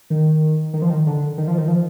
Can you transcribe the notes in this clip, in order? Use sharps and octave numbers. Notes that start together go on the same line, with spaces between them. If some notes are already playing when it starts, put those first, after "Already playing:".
D#3
D#3
F3
D#3
D3
D#3
F3
D#3
F3